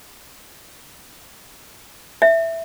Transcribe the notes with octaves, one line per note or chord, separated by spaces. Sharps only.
E5